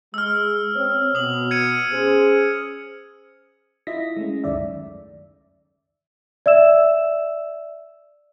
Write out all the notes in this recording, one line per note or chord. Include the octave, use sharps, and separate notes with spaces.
G#3 E6 F6
C4 C#5
B2 D#6 F#7
G#6 C#7 D#7
C#4 G#4 C5
E4 F4 D#5 E5 A#6 B6
G#3 A3 C#4
C#2 F#2 D#3 D5 E5
D5 E5 E6 E7